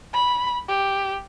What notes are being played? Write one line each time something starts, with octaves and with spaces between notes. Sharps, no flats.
B5
G4